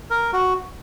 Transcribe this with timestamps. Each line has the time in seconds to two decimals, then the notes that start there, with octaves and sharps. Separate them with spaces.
0.11 A#4
0.33 F#4